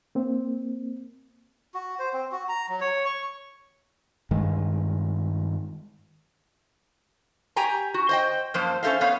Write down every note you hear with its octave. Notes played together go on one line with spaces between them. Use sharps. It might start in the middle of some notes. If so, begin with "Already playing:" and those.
A#3 C4
F#4
C5
C4
F#4
A#5
F#3
C#5
C#6
G2 D#3 G#3
G4 G5 G#5 A#5
F#4
C5 D#5 G5
F#2 F3 A#3 C5
C#4 A4 C5 E5 F5
A3 B3 C#5 F5